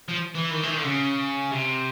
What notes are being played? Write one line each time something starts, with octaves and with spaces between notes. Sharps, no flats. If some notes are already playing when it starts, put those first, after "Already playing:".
F3
E3
D#3
E3
D#3
D3
C#3
C3